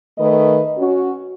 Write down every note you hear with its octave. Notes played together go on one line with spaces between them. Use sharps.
D#3 A3 B4 D#5
C#4 F#4